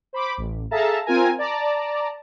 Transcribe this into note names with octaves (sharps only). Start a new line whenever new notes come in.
C5 B5 D6
A1
G#4 A4 E5 F5 A5 A#5
C4 F4 A#4 G#5 A#5
D5 A5 A#5